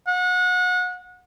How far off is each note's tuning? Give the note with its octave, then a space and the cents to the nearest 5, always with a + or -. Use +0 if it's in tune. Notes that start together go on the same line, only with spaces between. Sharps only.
F#5 -30